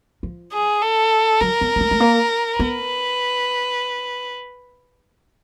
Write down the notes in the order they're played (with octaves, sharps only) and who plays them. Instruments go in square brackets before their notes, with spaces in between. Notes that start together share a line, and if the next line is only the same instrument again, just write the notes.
[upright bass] F3
[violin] G#4
A4
[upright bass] F#3 [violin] A#4
[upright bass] B3
A#3
A3
A3
A#3
[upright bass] B3 [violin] B4